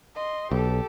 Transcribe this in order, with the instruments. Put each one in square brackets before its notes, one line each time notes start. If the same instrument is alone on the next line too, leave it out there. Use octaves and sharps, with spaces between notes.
[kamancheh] D#5 C6
[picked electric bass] B1 [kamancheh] G4 A4